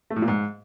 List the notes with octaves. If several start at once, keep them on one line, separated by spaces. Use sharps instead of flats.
A3
A2
A#2
G#2